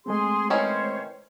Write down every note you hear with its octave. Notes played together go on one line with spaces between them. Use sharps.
G#3 A3 C4 G#4 C6
D#3 E3 C#4 C5 C#5